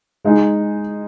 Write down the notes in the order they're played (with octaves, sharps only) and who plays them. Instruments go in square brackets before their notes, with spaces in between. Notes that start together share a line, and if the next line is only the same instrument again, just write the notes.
[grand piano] G#3 D#4 G#4